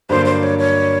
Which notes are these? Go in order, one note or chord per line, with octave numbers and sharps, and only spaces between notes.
G2 D3 F#3 A#3 D4 C5
C5
C#5
C#5